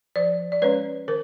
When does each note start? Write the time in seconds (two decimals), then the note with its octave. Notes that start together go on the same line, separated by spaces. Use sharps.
0.16 F3 C5 D5
0.52 D5
0.62 G#3 C#4 B4 C#5
1.08 D#3 A#4 C5